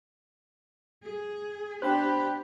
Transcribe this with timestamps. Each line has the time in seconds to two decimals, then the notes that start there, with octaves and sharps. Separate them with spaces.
1.03 G#4
1.82 B3 D4 G4 C5 G5 B5 F#6